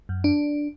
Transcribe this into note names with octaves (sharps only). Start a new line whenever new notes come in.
F#2
D4